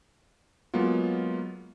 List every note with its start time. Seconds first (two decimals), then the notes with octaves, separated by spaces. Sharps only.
0.74 F#3 G#3 A#3 B3 F4